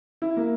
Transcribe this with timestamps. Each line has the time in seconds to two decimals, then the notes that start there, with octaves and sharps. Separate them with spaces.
0.22 E4
0.37 A#3